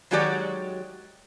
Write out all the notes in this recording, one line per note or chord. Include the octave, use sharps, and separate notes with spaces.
D#3 F#3 G#3 F#4 G4 D5